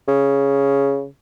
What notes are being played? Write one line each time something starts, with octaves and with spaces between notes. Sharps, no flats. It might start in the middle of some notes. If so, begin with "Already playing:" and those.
C#3